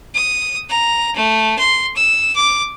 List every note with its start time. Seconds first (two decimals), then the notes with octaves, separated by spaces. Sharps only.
0.15 D#6
0.69 A#5
1.16 A3
1.59 C6
1.96 E6
2.35 D6